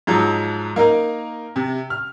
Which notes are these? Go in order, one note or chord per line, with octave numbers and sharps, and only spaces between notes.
G#2 F3 F#3
A#3 D#4 A#4
C3
F6